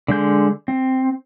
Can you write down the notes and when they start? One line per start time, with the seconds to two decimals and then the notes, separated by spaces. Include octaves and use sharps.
0.08 D3 G#3 G6
0.68 C4